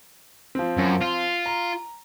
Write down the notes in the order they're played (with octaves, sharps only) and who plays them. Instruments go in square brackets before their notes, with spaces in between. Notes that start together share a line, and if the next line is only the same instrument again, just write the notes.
[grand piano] F3 C4
[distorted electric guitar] F#2
F4
[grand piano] A#5